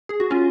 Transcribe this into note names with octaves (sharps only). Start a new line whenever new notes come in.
G#4
F#4
C#4 F4